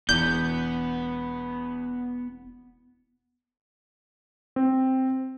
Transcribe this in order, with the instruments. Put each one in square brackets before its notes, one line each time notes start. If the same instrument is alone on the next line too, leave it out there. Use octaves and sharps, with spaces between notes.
[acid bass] E1 [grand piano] E2 [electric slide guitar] B3 [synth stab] G6
[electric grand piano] C4